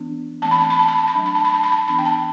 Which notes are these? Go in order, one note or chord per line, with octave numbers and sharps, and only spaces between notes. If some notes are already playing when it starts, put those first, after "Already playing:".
Already playing: E3 B3 D4
E3 A3 C4 A5
B5
A5
B5
A5
B5
A5
B5
F#3 A3 D4 A5
B5
A5
B5
A5
B5
A5
E3 B3 D4 B5
G5
A5